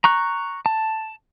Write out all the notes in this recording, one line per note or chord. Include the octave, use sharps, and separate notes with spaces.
A#5 C#6 F#6
A5